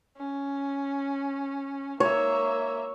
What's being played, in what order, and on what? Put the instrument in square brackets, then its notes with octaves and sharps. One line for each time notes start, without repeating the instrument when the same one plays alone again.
[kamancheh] C#4
[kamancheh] A#3 E5 [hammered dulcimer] C#5